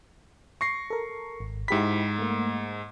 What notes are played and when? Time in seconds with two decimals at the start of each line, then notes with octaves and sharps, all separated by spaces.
0.61 C#6 A#6 C7
0.90 A4 A#4
1.40 G#1
1.68 G#2 E4 G4 B5 B6
2.19 A3 A#3